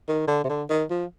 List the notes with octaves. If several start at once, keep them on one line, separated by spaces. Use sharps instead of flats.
D#3
D3
C3
D3
D#3
F3